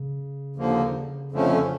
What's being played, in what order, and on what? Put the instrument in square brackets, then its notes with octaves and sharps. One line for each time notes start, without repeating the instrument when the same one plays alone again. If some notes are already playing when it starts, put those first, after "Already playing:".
Already playing: [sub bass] C#3
[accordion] D#2 D3 F3 A#3
F2 D3 F3 A3 C#4